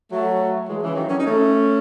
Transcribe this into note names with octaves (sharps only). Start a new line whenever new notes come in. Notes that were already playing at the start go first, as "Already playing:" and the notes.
F#3 A3
E3 G#3
C#3 E3
D#3 F#3
C#4
D#4
A3 C#4